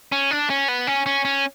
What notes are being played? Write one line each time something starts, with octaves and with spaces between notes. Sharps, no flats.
C#4
D4
C#4
B3
C#4
C#4
C#4